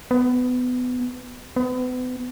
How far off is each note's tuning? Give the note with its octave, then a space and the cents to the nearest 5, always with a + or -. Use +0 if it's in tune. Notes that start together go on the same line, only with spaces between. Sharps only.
B3 +20
B3 +35